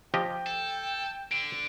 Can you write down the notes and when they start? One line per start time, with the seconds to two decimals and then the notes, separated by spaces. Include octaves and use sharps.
0.14 F3 G4 D#5 G5
0.46 A4
1.31 D3 D7